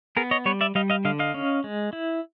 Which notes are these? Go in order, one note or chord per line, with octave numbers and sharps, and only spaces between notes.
B3 G#4 A#4
C#5 D#5
G3 B4 C#5
D5 E5
G3 D#5 F5
D#5 F5
D3 D#5 F5
D#5 F5
C#4
G#3
E4